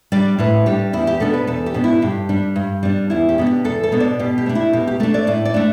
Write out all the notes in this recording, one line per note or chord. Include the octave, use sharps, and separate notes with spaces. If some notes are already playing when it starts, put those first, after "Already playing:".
G3 D4 D5
A2 B4
G3 D4 G4
E2 E4
G4
B2 B3 D4 A4
B4
E2 A4
G4
B2 B3 D4
E4
G2 G4
G3 D4
G2
G3 D4
E2 E4
G4
B2 B3 D4
G4
E2 A4
A4
B2 B3 D4
D5
B2 G4
G4
A3 D4
E4
B2 G4
G4
A3 D4 A4
D5
A2 D5
D5
A3 D4